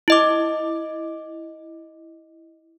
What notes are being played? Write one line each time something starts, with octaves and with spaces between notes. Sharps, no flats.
E4 D#5 D6